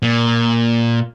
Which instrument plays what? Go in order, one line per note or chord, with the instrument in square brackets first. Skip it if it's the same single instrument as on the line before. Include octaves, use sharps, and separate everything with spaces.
[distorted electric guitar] A#2